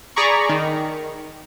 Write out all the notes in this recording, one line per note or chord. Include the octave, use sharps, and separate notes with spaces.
G#4 D5 A#5 B5 C#6
D#3